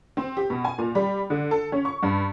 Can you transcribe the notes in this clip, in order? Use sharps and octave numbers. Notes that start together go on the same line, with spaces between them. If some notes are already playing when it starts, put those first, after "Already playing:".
C4
G4
B2
G#5
A#2
G3
D3
A4
C#4
C#6
G2